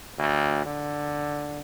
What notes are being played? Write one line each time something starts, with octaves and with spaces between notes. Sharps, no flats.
D2
D3